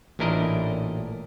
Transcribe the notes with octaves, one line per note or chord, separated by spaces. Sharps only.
A1 A#2 D4 E4 A#4 D#5